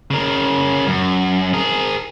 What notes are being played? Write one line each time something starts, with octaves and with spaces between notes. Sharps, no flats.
C#3 A#4
F#2
G#4 A#4